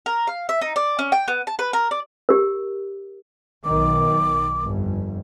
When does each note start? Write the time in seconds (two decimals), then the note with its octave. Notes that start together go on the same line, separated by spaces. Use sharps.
0.06 A#4
0.27 F5
0.49 E5
0.61 D#4
0.76 D5
0.99 C#4
1.12 G5
1.28 B3
1.47 A5
1.59 B4
1.73 A#4
1.91 D5
2.29 G4 A#4
3.65 B1 D#3 D6
4.65 G1 F2